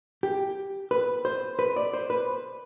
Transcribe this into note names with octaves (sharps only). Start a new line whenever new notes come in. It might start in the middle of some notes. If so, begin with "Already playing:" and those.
G4
B4
C5
B4
D5
C5
B4